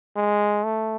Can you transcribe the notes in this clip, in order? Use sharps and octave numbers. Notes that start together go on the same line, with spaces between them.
G#3
A3